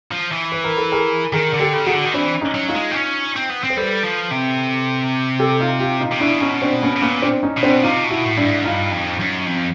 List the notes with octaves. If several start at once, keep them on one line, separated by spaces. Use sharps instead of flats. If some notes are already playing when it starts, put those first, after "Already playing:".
F3
E3
B4
A#4
A4 B4
G#4 A#4
D#3 G#4 A#4
D3
G4 A4
C#3
D#3 F#4 G#4
D3
D#3
E3 C4 D4
C#4 D#4
F#3
D#4 F4
G#3
C4
C#4
C4
B3
C4
C5
G3 A4 B4
F3
C3
G4 A4
D#4 F4
F4 G4
D#4 F4
C3
B2 D4 E4
C#4 D#4
C4 D4
B3 C#4
B2
A#2 B3 C#4
C4 D4
C#4 D#4
B2
C4 D4
C3 D#4 F4
B2
E4 F#4
A2
G2 D4 E4
G#2
G2 D#4 F4
F2
F#2
F2